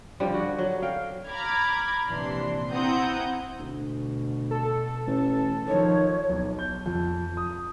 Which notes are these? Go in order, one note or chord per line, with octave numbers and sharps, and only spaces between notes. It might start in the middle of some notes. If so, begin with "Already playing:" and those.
D3 F3 G3
F#4
F#3
F5 G5
A#5 B5 D6 F6 G#6
A#1 C3 E3 D4 C6
C4 E4 F#5 A#5 D#6 G6
D2 B2
A4
A1
D#3 F3 C#5
B1
G6
F2
D#6